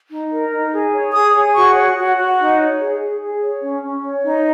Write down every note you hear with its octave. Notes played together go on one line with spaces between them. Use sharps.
D#4
A#4
D#4
G#4
C#5
G#4 D#6
G#4
F#4 C#6
C#5
F#4
F#4
D#4
C#5
G#4
G#4
G#4
C#5
C#4
C#4
C#5
D#4